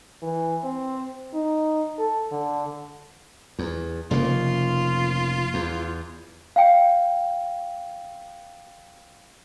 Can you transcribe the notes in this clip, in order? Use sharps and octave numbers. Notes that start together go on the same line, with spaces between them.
E3
C4
D#4
A4
D3
E2
F1 C#3 A#3 F4
E2
F5 G5